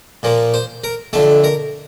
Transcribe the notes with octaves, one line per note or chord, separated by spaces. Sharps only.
A#2 F3 A#3
C5
A#4
F2 D3 A3 A4
A#4